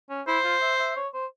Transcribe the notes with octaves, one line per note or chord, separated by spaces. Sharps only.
C#4
E4 C5
F4
E5
E5
C#5
C5